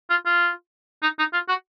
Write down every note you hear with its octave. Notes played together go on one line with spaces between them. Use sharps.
F4
F4
D#4
D#4
F4
F#4